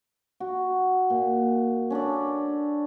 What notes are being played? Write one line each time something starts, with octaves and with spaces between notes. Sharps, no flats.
F#4
A#2
C#4 D4 A4 D5